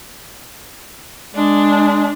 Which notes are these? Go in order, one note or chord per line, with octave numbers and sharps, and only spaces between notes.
G#3 D4